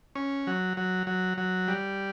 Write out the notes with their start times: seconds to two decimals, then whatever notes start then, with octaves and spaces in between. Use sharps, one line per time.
0.15 C#4
0.47 F#3
0.77 F#3
1.07 F#3
1.38 F#3
1.68 G3